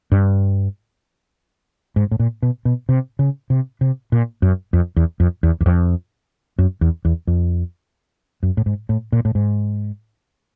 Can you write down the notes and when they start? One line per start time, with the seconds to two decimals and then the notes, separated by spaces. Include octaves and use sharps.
0.12 G2
1.96 G#2
2.11 A2
2.19 A#2
2.42 B2
2.65 B2
2.89 C3
3.19 C#3
3.50 C3
3.81 C3
4.12 A#2
4.42 F#2
4.73 F2
4.96 E2
5.20 F2
5.43 E2
5.61 E2
5.66 F2
6.58 F#2
6.81 E2
7.05 E2
7.27 F2
8.43 F#2
8.57 A2
8.66 G#2
8.89 A2
9.12 A#2
9.25 A2
9.35 G#2